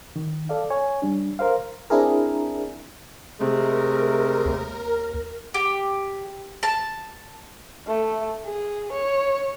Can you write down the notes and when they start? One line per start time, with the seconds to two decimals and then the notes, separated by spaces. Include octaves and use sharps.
0.16 D#3
0.49 A4 D5 F5
0.70 C#5 G#5
1.02 G3 D4
1.39 A#4 C5 F5
1.90 C4 D4 E4 G#4 A#4
3.39 C3 G#3 A3 A#4
4.46 D#2
5.54 G4
6.63 A5
7.87 A3
8.46 G#4
8.92 C#5